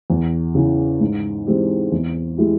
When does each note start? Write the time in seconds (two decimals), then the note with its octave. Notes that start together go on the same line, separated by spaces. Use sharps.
0.10 E2
0.55 C#3 E3
1.00 G#2
1.47 E3 G#3 C4 G4
1.92 E2
2.37 E3 G#3 E4 G4